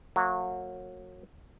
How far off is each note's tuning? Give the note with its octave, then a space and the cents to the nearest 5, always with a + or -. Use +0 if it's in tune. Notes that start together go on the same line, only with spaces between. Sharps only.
F#3 -25 A#3 -40